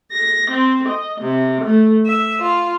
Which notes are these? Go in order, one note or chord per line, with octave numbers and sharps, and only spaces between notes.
A#6
C4
D#5
C3
A3
E5
F4